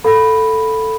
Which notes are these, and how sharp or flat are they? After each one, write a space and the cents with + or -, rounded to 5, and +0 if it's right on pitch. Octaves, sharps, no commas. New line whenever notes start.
A4 +5 F5 +30 B5 +0